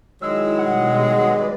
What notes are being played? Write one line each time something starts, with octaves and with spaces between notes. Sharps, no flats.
D#3 F#3 G#3 E4 E6
B2 G3 F#5
B4 D5